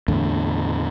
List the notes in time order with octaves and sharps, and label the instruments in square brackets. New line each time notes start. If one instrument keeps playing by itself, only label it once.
[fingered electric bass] E2 A2 D3